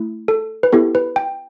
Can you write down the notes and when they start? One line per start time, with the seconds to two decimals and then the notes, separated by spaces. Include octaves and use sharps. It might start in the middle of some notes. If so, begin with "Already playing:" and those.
Already playing: A3 E4
0.28 A4
0.63 B4
0.73 B3 E4 G4 A4
0.95 B4
1.16 G5